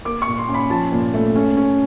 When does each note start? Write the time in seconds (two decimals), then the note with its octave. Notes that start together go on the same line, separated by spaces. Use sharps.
0.05 A#3 D6
0.22 C#6
0.27 A#2
0.38 C6
0.49 C#4
0.54 B5
0.70 F3 A5
0.92 A#2
1.14 A3
1.36 C#4
1.57 C#4